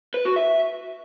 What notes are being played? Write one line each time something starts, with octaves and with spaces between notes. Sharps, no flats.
B4
F#4
E5